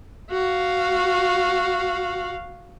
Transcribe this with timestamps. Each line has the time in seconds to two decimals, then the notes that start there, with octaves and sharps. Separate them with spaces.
0.31 F#4 F5